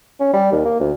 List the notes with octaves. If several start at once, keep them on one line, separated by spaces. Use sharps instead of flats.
C#4
G3
D#2
A#3
D2